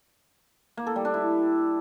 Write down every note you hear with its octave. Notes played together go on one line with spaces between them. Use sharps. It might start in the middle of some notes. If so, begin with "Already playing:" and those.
A#3
A4
G3
D4
E4